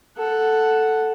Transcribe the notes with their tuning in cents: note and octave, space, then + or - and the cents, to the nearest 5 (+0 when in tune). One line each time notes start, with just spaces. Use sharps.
A4 +0 F#5 +0